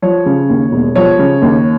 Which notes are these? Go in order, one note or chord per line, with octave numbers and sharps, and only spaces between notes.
F3 C#5
C#3
D#2
E1
F3 C#5
C#3
D#2